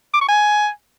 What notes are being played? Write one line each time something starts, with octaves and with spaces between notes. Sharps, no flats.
D6
C#6
G#5